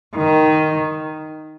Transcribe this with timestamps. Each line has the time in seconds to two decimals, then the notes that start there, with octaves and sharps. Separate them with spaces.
0.16 D#3